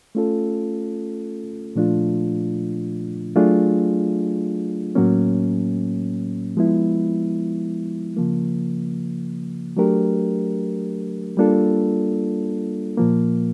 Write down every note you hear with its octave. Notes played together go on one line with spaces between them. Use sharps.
A3 C#4 F4 A4
A#2 F3 A3 D4 F4
F#3 A3 D4 F4 G#4
A2 F#3 A#3 C#4
F3 G#3 B3 E4
C#3 F3 A#3
F#3 A3 D4 G4 A#4
G3 A#3 D4 F4 A4
A#2 F3 A#3